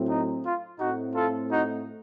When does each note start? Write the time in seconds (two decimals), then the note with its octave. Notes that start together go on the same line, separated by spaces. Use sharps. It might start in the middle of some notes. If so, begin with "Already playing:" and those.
Already playing: A2 F#3 C4
0.09 D#4
0.44 F4
0.80 A2 A3 C4 D#4 F#4
1.15 F4 A4
1.51 D#4 F#4